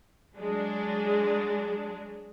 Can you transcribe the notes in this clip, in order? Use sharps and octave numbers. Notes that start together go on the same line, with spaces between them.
F#3 G#3 D4